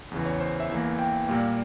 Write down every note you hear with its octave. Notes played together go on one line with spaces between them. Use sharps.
E2 C#3 E3
C#5
C5
E5
E2 E3 A#3
G5
A#2 G3 A#3